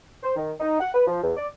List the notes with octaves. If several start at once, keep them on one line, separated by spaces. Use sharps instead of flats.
C5
D#3
D#4
F#5
B4
F3
E2
D5